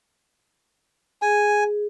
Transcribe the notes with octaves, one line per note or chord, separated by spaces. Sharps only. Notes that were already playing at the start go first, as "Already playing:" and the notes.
G#4 G#5